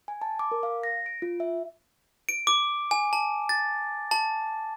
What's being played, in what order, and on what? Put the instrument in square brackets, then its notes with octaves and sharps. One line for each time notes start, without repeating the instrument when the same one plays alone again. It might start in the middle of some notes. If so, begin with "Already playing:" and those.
[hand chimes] G#5
A5
D6
A#4
F5
A#6
D7
F4
E5
[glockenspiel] D7
D6
G#5
A5
A6
A5